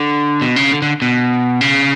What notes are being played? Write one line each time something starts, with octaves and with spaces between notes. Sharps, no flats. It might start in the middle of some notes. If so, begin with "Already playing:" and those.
Already playing: D3
B2
C#3
D3
D3
B2
C#3